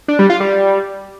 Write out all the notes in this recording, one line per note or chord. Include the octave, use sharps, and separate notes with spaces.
D4
G3
F4
G3